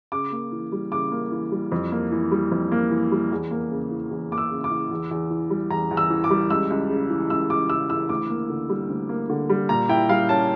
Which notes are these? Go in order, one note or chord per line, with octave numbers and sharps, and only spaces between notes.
C#3 D6
A#3
E3
G3
C#3 D6
A#3
E3
G3
F2
A#3
E3
G3
F2
A#3
E3
G3
E2
A#3
C#3
E3
E2
A#3 D6
E6
C#3
D6
E3
E2
E2
E3
G3
E2 A#5
E2
E6
E3
D6
G3
C#2 E6
C#2
C#3
E3
C#2 E6
C#2 D6
C#3 E6
E3 E6
D2 D6
A#3
D3
G3
D2
A#3
D3
G3
A#2 A#5
E4 G5
G3 F5
C#4 A5